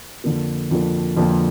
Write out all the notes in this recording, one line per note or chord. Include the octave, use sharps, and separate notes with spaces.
F2 D3 F3 A#3
F2 D3 F3 A#3
F2 D3 F3 A#3